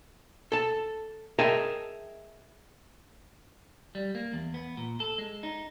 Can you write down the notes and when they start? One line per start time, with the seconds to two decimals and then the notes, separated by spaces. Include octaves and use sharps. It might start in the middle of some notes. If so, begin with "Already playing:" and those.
0.52 A4 A5
1.39 G#4 A#4 D#5 E5 G5 A5
3.95 G3
4.15 A#3
4.33 E2
4.54 B3
4.77 A#2
5.00 A4
5.18 G#3
5.43 D#4